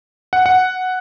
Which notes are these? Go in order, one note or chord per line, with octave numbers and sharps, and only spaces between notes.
F#5
F#5